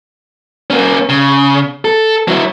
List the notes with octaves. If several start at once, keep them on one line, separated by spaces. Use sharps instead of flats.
A#3 C#4
C#3
A4
F#3 E4